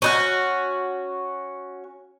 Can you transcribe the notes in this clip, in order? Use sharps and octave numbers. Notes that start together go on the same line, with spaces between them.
C#4 D#4 F#4